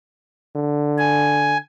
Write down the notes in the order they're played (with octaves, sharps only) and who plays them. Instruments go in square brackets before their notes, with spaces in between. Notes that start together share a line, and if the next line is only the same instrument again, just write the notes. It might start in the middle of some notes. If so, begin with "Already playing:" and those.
[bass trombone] D3
[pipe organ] G#5